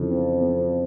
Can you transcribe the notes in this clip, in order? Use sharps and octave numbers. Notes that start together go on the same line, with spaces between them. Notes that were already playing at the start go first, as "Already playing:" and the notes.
Already playing: F2 C#3 E3
C4
C4